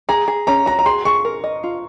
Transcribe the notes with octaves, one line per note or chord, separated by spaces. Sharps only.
G#4 A#5
G#4
C#4 A#5
F#4 A#5
A#5
G#4 C6
G#4 C#6
A#4
D#5
F4